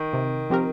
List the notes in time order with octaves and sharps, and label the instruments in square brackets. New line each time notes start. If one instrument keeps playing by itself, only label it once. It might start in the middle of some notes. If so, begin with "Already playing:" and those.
Already playing: [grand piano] D#3
[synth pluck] C3
F3 C4 G4 A#4